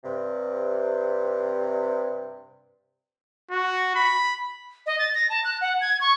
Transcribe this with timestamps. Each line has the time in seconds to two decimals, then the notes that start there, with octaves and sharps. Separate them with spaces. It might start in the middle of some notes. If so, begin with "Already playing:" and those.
0.04 G2 C3
3.51 F#4
3.95 B5
4.86 D#5
4.99 A6
5.14 A#6
5.30 A5
5.44 F#6
5.61 F#5
5.81 G#6
6.01 C#6